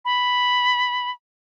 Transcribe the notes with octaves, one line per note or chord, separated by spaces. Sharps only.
B5